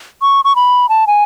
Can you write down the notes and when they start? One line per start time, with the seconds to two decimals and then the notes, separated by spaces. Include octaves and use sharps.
0.22 C#6
0.45 C#6
0.56 B5
0.89 A5
1.07 G#5